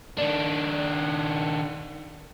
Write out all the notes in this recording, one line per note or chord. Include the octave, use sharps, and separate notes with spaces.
D#3 D4